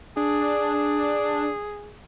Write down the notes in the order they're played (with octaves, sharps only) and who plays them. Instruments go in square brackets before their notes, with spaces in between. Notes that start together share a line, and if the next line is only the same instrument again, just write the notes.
[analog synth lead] D4 [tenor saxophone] G#4